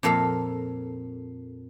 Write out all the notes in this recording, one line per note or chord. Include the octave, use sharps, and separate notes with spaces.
F2 A#2 A4 F5 A#5